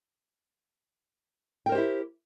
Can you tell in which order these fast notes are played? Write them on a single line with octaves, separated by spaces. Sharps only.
G5 A#4 C5 G4 E4